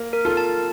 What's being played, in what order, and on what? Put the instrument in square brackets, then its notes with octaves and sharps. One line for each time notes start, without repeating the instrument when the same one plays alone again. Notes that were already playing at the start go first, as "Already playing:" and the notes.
Already playing: [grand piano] A#3
[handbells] A#4
[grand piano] F4 A4
[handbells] A5